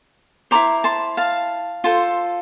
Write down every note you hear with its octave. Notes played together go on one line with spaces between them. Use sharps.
E4 A4 C5 A#5 D6
A5 C6
F5 A5
F4 A4 C5